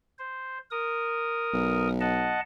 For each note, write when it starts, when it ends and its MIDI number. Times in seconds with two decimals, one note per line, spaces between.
0.19 0.58 72
0.71 1.89 70
0.71 1.89 87
1.53 2.41 35
2.00 2.40 75
2.00 2.40 78
2.00 2.40 81